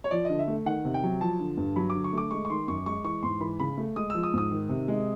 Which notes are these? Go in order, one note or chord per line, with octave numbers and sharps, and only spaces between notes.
C#5
F3 D5
D3 D#5
E5
A3
D#3 F#5
C3
G5
F#3
F3 A5
D3
G2
F#3 B5
D6
D3
C#6
A3 D6
G#3 C#6
C#6
D#3 C6
F#2 C#6
G#3 C#6
E3 C#6
G#2 C6
E3 B5
C#3 B5
A3
G#3 D#6
F3 E6
D#6
G#2 D#6
D#3
C3
G#3